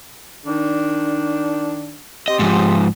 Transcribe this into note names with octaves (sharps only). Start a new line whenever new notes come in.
D#3 D4
C4 G4 D#5
G#2 F3